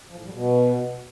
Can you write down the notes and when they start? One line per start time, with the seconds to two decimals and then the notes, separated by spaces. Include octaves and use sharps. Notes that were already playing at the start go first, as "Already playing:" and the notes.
0.10 F3
0.18 A2
0.25 G3
0.33 B2